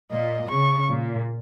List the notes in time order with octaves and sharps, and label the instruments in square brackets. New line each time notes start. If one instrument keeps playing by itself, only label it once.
[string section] A#2 [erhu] D#5
[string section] C#3 [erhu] C#6
[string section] A#2